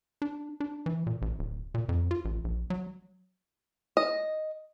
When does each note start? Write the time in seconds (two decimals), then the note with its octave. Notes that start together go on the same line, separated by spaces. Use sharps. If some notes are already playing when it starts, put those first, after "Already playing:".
0.22 D4
0.60 D4
0.86 E3
1.07 A#2
1.22 A1
1.39 D1
1.74 A#2
1.89 F2
2.11 F4
2.25 A1
2.44 A#1
2.70 F#3
3.97 D#5